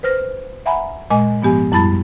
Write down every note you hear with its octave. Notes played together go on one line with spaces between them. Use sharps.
B4 C5 F6 A#6
E5 F#5 G#5 A#5 B5
A#2 G#3 D#5 G#5
G#2 F3 B3 G4 G#5
F#2 G3 E4 A5 B5 A6